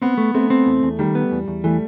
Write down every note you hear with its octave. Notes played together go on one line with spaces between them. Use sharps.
B3 C4
A3
A3 C4
C4
E2
E2
D#3 G3
B3
E2
E2
E3 A3